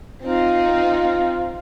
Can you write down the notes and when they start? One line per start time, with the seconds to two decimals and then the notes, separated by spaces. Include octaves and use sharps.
0.23 C4 D#4 F4